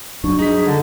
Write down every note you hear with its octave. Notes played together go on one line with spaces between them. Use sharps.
G2 F#3 D4 C#6
D#4 G#4 B6
D3